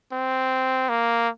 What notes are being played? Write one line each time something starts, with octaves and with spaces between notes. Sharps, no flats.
C4
A#3